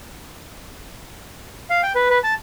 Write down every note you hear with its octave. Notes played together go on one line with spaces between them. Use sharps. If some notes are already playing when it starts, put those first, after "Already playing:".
F5
G5
B4
B4
A5